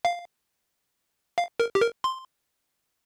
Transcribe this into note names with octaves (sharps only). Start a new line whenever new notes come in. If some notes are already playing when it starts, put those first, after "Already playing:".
F5
F5
A#4
G4
A#4
C6